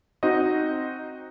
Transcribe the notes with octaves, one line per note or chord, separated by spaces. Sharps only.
C4 D#4 F#4 C5 D#5